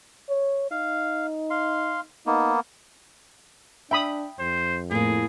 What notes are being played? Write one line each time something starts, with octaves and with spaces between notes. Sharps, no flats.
C#5
D#4 F5
F5 C6
A#3 B3 D#4
D4 E5 G5 B5 D#6
F2 C5
A2 A#3 G#4